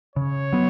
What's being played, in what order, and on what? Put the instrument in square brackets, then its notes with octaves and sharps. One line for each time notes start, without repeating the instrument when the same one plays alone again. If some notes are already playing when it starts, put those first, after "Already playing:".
[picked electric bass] C#3 [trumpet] C#5
[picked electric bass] F#3 B3